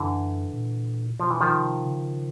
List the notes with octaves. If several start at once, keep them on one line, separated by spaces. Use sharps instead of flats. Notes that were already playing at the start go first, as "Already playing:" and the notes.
Already playing: F#2 D3 E3
A#2
B2 F3
E3
D#3 F3
C3
C#3